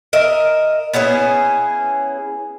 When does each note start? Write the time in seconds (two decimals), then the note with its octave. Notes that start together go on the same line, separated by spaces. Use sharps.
0.13 A#4 D#5 E5
0.93 B3 C#4 E4 G#4